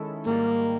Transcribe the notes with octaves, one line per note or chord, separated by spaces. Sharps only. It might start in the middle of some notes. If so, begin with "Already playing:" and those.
Already playing: D#3 G#3 C#4 E4 A4
G#2 D#3 G3 A#3